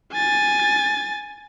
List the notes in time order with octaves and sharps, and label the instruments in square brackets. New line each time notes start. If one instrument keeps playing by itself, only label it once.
[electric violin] G#5 A6